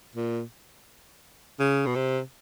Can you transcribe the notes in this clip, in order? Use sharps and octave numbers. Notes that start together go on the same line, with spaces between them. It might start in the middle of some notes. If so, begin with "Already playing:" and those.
A#2
C#3
B2
C3